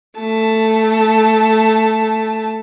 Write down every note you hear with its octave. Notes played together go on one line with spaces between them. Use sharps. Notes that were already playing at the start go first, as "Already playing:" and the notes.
A3 A5